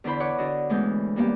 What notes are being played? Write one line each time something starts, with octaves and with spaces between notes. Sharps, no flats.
E2 D3 E4 C5 B5
B4 C#5 F#5 C#6 D6
D3 D4 F#4 D#5
D2 E3 G#3 A3 B3 G6
G3 A#3 B3 G4